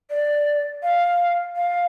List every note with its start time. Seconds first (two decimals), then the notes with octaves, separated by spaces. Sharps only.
0.10 D5
0.83 F5
1.56 F5